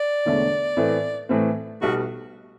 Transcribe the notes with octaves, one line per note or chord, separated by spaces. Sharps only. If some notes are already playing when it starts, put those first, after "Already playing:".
Already playing: D5
E1 E2 D3 A3
A2 E3 A3 C4
A2 E3 A3 C4
B1 B2 G3 F#4